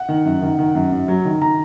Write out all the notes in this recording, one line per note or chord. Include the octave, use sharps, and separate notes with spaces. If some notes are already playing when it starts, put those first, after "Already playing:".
Already playing: F#5
D#3
F#2
D#3
D#3
F#2
F#2
F#3
D#3
D#3 A#5